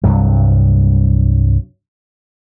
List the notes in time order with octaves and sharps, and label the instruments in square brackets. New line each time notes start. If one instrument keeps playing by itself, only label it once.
[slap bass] C2 G2 F#3